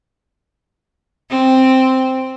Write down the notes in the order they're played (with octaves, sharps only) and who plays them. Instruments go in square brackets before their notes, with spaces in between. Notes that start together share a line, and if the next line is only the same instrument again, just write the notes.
[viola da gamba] C4